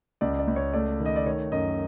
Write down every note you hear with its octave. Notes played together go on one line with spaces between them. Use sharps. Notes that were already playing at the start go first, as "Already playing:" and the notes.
C#2 D5
D5
C#2
C#5
A3 D5
D#3
D#5
D5
D#3 C#5
F#2 D#5